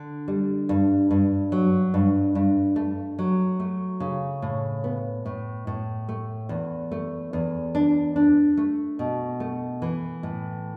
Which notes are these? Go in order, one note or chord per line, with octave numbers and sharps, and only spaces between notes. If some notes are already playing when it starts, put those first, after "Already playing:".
Already playing: D3
G3
G2
G2
F#3
G2
G2
A3
F#3
A3
C#3
A2
B3
A2
A2
A3
E2
A3
E2
D4
D4
A3
B2
A3
E3
A2